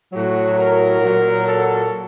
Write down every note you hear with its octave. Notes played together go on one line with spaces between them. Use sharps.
A2 F#3 F#4
A#4
A#2 F#3
A4